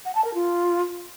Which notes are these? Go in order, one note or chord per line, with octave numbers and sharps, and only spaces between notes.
F#5
A5
A#4
F4